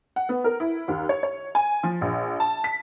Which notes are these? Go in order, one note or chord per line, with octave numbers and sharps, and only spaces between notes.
F#5
B3
A#4
E4
D#2
C#5
C#5
G#5
F3
A#1
A5
B6